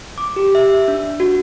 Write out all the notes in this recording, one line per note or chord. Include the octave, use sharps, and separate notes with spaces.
D6
G4
E5
D4
F#4